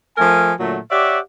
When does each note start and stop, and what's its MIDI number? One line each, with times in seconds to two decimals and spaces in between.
0.17 0.52 53
0.17 0.52 57
0.17 0.52 70
0.17 0.52 80
0.59 0.78 46
0.59 0.78 50
0.59 0.78 54
0.59 0.78 57
0.90 1.19 67
0.90 1.19 73
0.90 1.19 74
0.90 1.19 76
0.90 1.19 78